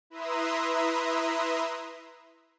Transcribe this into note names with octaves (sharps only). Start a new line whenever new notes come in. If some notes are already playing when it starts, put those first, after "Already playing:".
E4 B4 E5 A#5 C6 D#6